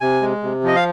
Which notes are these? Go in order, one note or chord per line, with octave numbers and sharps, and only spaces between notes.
C3 G#5
G#3
C3
F3 D#5
F5